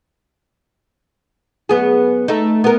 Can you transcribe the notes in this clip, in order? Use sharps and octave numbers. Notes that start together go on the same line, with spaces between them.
F#2 B3 G#4
A3 D#4
B3 A#4